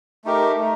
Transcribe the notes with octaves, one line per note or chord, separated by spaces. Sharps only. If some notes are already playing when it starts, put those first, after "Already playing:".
A3 D#4 G4 A#4
A3 D#4